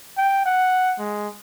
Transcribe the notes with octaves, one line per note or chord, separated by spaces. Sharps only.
G5
F#5
G#3